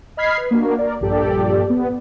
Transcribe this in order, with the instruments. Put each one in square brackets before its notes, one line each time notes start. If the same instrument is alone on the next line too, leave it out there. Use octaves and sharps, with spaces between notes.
[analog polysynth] D#5 B5 F6 G#6 B6 C7
B4
A#3 D4 F#4
A#4 D5
A#1 G2 A#2 G4 A4 D5
B3